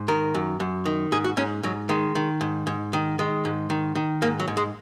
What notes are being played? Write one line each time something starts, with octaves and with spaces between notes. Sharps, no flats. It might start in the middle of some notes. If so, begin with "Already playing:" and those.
Already playing: G#2
D#3 A#4
F#2
F#2
D#3
G#2 G#4
F#4
G#2 C#4
G#2 F#3
D#3 G#3
D#3
G#2
G#2
D#3
D#3 G#3
G#2
D#3
D#3
G#2 A#3
F#3
G#2
G#3